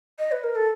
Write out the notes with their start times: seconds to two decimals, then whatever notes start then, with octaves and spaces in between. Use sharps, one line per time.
0.19 D#5
0.32 B4
0.44 A#4
0.56 A4